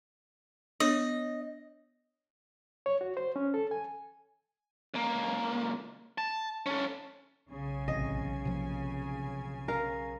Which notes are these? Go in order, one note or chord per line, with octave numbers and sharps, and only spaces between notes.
B3 D4 C#5 D#5
C#5
F#4
C5
C#4
A4
G#5
C#2 A#3
A5
C#4 A4
B1 C#3 G#5
A1 C3 D#5
C3 F3 A#3
A#4 F5